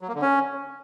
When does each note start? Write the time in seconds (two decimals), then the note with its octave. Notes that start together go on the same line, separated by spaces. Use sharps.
0.01 F#3
0.08 A#3
0.15 D3
0.22 C#4